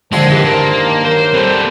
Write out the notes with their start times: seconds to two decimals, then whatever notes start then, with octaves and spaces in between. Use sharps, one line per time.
0.13 D3 D#3 F3 G#3 C4 C5 A5
0.31 G2 E3
0.45 A#3
1.04 F#3 A#4 C5
1.33 G3 C4 G4 A4 B4 C5